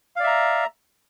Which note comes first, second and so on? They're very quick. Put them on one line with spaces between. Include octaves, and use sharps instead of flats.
F5 D5 E5 A#5